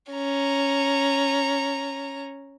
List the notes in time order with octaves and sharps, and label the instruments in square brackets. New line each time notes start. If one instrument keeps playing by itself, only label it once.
[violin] C#4 A#5